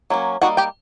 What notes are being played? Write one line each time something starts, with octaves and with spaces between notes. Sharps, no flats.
F#3 A#3 C#4
G3 A#3 D#4 F#4 F#5
G4 G5